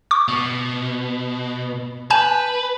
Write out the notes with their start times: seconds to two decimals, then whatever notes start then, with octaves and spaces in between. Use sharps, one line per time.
0.11 C#6 D6
0.28 B2
2.10 B4 G#5 A5 G6